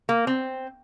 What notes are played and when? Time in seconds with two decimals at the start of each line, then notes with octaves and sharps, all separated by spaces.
0.09 A#3
0.27 C4